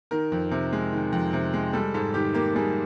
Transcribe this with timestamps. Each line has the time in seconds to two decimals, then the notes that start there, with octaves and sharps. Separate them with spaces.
0.11 D#3 A#4
0.32 F2
0.51 C3
0.73 G#3
0.93 D#3
1.12 F2
1.33 C3
1.54 G#3
1.73 G3 A4
1.94 G#2 A4
2.14 D#3 G4
2.34 A#3 G4
2.55 G3 G#4